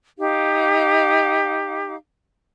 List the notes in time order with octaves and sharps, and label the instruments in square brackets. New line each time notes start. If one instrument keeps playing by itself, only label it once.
[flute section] D#4 G4 F5